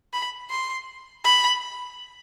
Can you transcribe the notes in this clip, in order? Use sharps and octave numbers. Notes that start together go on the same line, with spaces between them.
B5
C6
B5